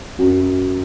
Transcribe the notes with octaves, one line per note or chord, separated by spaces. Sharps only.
F#2 F#3